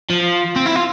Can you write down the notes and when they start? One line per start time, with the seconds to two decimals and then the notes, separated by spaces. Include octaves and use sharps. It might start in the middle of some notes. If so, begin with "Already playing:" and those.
0.10 F3
0.56 C4
0.66 E4
0.76 F4